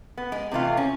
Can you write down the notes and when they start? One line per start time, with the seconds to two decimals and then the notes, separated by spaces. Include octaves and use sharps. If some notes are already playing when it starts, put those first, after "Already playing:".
0.17 B3
0.32 G#3
0.51 C3 E3 A3 F4
0.77 C#4